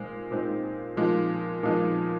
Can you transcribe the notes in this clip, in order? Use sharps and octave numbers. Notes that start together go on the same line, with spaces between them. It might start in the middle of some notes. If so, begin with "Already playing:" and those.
Already playing: A#2 G#3 C4 D#4
A#2 G#3 C4 D#4
A#2 F3 G#3 D#4
A#2 F3 G#3 D#4